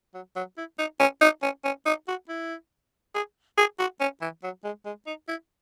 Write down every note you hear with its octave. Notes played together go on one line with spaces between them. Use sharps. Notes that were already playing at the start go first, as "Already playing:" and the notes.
F#3
F#3
E4
D#4
C#4
D#4
C#4
C#4
D#4
F#4
E4
G#4
G#4
F#4
C#4
E3
F#3
G#3
G#3
D#4
E4